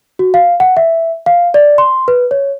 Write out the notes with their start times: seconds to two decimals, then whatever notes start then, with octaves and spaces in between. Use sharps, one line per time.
0.19 F#4
0.34 F5
0.60 F#5
0.77 E5
1.26 F5
1.54 D5
1.78 C6
2.08 B4
2.31 C#5